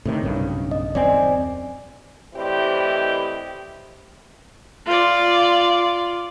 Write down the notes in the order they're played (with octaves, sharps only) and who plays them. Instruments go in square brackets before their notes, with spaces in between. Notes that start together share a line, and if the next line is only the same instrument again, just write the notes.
[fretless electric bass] A2 C3 D#3
B1 G2 C#3
[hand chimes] D#5
[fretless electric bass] D#1 F#2 C4 [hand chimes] D5 G#5
[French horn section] A2 E3 C4 G4 D5 D#5
[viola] F4 D5